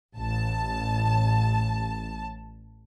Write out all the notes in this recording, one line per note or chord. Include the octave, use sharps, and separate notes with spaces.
A1 A5